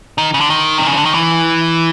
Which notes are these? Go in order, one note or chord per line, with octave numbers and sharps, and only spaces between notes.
D#3
C#3
D3
D#3
C3
C#3
D3
D#3
E3